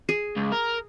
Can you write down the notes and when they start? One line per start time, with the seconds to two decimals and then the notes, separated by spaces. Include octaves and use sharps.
0.09 G#4
0.37 C#2
0.52 A#4